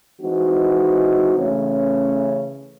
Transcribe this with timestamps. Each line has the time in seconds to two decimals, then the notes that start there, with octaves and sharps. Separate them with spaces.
0.21 E3 G#3 C4 D#4 F#4
1.37 C#3 E3 A3 C#4